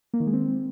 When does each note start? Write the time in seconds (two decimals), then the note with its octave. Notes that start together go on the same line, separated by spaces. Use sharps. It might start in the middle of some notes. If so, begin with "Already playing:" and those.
0.13 A#3
0.20 D#3
0.27 G#3
0.33 C4